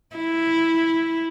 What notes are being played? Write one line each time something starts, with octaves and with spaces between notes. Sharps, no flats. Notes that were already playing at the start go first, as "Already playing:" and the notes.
E4